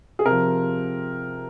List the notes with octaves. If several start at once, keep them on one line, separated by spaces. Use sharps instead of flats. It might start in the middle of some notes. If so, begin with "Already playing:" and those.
G#4
C3 F3 A#4